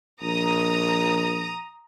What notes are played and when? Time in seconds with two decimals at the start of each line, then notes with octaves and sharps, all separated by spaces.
0.22 A#1 A#5 D#6